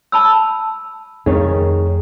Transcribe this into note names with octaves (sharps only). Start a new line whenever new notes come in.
A5 B5 E6
F2 D#3 A3 G#4 C#5